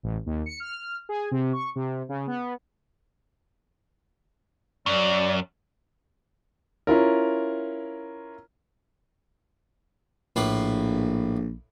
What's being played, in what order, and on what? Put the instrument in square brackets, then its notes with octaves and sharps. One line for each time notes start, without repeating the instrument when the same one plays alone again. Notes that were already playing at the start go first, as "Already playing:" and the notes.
[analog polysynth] A1
D#2
C#7
F6
G#4
C3
C#6
C3
C#3
B3
[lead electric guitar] F#2 [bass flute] D5
[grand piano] C#4 E4 F4 A#4
[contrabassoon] A#1 [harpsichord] A2 A#3 B4